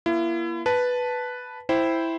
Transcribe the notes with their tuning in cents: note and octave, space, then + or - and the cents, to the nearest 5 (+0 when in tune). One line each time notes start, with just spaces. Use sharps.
A#3 +30 E4 +35
B4 +0 A5 +0
E4 +0 C5 +0 G5 +0